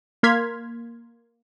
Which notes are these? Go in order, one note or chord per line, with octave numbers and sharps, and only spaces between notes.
A#3 C6 F6 G#6 B6